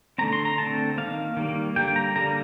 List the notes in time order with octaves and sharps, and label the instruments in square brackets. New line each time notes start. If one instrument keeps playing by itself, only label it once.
[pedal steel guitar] D3 A3 C4 A#5
C6
A#5
D3 A3 C4 A5
D#3 G3 A#3 F5
D#3 G3 A#3
D3 G3 A#3 G5
A#5
D3 G3 A#3 A#5